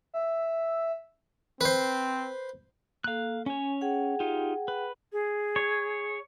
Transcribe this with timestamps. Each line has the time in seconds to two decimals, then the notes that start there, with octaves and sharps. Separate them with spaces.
0.14 E5
1.61 C4 B4 C5
3.04 A#3 A4 F5 F#6
3.46 C#4 C#5 G#5
3.81 G#4 F#5 G5
4.20 D#4 F4 G4
4.68 B4
5.13 G#4
5.56 C#5